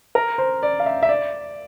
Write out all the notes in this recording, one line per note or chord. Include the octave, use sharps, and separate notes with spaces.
A#4
C5
D5
F5
E5
E5
D5